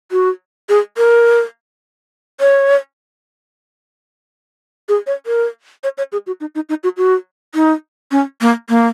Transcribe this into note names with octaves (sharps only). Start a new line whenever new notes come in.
F#4
G#4
A#4
C#5
G#4
C#5
A#4
C#5
C#5
G#4
F#4
D#4
D#4
D#4
F#4
F#4
D#4
C#4
A#3
A#3